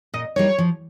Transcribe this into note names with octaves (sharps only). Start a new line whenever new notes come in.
A#2 D#5
G3 A#3 D#4 C#5
F3